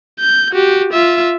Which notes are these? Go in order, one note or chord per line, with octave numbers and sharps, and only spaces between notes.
G6
F#4 G4
F4 E5